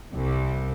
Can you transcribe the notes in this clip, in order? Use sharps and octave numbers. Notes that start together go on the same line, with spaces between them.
C2